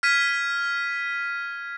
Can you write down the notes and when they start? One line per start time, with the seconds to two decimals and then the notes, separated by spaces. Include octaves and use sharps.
0.03 F6 G#6 B6 D#7